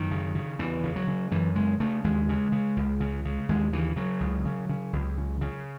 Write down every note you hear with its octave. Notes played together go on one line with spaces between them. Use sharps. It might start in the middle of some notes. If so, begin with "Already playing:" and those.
Already playing: F#2 D#3
C#3
C#3
E2 E3
C#3
F#3
C#3
F#2 E3
C#3 G#3
C#3 A3
D#2 G#3
C#3
C#3
C#2
C#3
C#3
D#2 G#3
C#3 E3
C#3 F#3
C#2
C#3
C#3
C#2
C#3
C#3